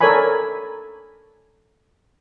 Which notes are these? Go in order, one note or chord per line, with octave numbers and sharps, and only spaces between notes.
A4 A#4 C#5 D5 G#5 B5